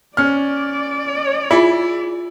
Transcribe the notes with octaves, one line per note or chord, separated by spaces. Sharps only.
C#4 C5 D5 F6
E4 F4 G#4 G#5